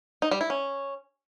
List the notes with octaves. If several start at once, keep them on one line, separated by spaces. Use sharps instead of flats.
D#4
G3
E4
C#4